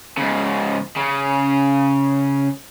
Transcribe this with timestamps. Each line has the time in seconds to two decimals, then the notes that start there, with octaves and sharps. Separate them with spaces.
0.18 G#2 C#3
0.97 C#3